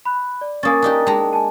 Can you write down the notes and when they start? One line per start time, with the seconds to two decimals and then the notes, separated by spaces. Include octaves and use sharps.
0.05 B5 F#6
0.41 D5
0.63 A#3 C#4 G#5 D#6 A6
0.82 D4 D#4 G4
1.07 G#3 D#4 G5 A5 A#5
1.33 G#5 A5